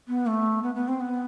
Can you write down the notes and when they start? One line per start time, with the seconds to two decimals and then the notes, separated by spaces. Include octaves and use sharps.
0.08 B3
0.27 A3
0.63 B3
0.75 B3
0.88 C4
1.01 B3